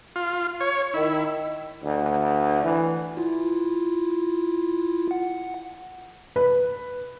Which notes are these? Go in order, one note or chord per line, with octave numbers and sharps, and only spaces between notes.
F4
C#5
D#3 D#4 E4
D2
E3
E4 F4
F#5
B4